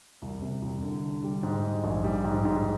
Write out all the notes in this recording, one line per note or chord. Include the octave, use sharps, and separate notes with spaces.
C2
C3
C2
D3
D3
G3
G#2
G#3
A#1
G3
G#2
G#2